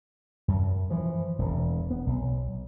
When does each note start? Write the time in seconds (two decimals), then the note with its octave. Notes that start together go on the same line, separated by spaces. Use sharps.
0.48 F#2
0.90 E3 F3
1.39 E1
1.91 B3
2.07 B1